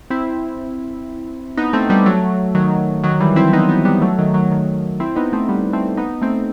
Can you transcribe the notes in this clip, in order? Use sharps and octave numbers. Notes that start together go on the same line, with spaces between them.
C4 E4
B3 D#4
A3 C4
G3 B3
F#3 A3
D#3 F#3
D#3 F#3
E3 G3
C4 E4
B3 D#4
B3 D#4
G3 B3
F#3 A3
D#3 F#3
D#3 F#3
D#3 F#3
C4 E4
B3 D#4
A3 C4
G3 B3
A3 C4
B3 D#4
A3 C4